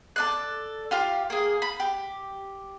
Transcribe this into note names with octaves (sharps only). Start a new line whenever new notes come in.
A4 D5 F#6
F4 G4 F5
A#3 G#4
B5
G4